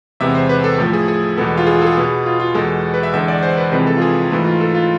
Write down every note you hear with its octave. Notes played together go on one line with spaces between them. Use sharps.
E2 C3 G#3 B3 E5
C5
B4
A4
A2 F3 A3 A4
G#4
G#4
E2 B2 G#3 B3 A4
F4
G#4
F4
A4
G#4
B2 B3 G#4
F4
F4
E2 B2 G#3 A4
B4
E5
E2 D3 G#3 E5
D5
C5
B4
F2 C3 E3 G#3 B4
A4
F4
G#4
G#2 E3 A3 F4
F4
A4
F4